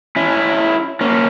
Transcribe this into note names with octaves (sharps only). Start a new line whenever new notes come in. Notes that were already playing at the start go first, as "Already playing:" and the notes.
C#4 E4
A#3 C#4